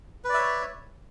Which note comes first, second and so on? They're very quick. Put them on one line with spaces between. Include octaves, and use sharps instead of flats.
B4 D5 E5 C#5